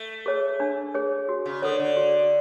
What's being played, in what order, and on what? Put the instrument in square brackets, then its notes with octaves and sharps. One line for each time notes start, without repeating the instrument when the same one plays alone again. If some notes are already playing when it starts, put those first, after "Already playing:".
Already playing: [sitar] A3
[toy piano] G#4 C#5
D4
G#4 C#5
F#4
[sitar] C#3
[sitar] D3 [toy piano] A4 C#5
[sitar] D3
[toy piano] F#4